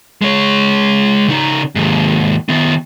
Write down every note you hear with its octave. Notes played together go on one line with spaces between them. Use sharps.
G#3 C#5
C#3 D#4
D#2 G#2
D#3 B3